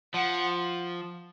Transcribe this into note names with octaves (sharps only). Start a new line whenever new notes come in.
F3 F#5